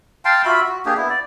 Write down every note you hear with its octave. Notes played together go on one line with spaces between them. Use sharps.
F5 G5 A5 C6
F4 F#4 E5 B5
F#4
A#3 D4 G4 G#4
B3 E4
D5